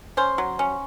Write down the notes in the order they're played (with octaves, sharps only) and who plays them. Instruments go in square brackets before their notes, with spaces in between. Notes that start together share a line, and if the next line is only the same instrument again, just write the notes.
[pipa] C#4 C5
F#3
C#4